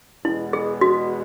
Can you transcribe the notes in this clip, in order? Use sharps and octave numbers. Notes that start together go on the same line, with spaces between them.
E2 B2 G#3 B3 E4
G#4
F#4